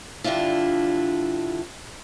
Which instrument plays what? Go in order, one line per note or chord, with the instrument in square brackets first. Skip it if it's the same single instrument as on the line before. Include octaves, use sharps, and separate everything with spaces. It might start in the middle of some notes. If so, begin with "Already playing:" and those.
[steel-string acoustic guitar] G2 D3 D4 E4 F4